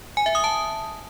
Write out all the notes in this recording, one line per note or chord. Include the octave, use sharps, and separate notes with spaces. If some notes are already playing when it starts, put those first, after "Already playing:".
G#5
E5
D#6
A5